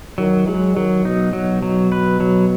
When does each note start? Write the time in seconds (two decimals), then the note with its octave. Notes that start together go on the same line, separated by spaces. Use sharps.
0.18 D#3 F#3
0.47 F#3 G#3
0.76 D#3 F#3
1.05 B2 D#4
1.33 B2 F#3
1.62 F#3
1.92 B4
2.20 F#3